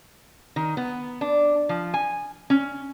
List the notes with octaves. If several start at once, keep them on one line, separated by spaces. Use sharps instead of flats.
D#3
B3
D4
F3
G#5
C#4